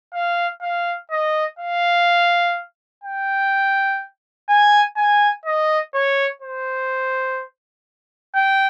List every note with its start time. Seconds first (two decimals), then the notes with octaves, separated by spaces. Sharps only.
0.14 F5
0.62 F5
1.11 D#5
1.59 F5
3.04 G5
4.49 G#5
4.97 G#5
5.46 D#5
5.94 C#5
6.42 C5
8.35 G5